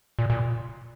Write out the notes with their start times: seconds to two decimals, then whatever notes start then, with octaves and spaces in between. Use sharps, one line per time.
0.19 A#2
0.30 A#2